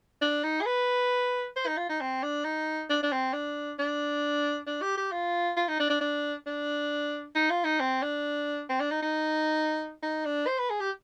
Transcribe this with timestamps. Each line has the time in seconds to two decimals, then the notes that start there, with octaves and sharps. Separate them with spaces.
0.21 D4
0.44 D#4
0.61 G#4
0.66 B4
1.56 C5
1.67 D#4
1.77 F4
1.89 D#4
2.01 C4
2.23 D4
2.44 D#4
2.90 D4
3.03 D4
3.12 C4
3.33 D4
3.79 D4
4.67 D4
4.82 G4
4.97 G4
5.12 F4
5.57 F4
5.68 D#4
5.80 D4
5.90 D4
6.01 D4
6.47 D4
7.35 D#4
7.50 F4
7.64 D#4
7.80 C4
8.03 D4
8.70 C4
8.80 D4
8.91 D#4
9.02 D#4
10.03 D#4
10.25 D4
10.47 C5
10.59 B4
10.70 G#4
10.80 G4